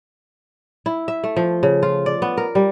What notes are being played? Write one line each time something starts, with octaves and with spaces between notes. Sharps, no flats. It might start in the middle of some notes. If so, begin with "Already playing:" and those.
E4
E5
A3
F3
C#3
F4
D5
B3
A#4
G3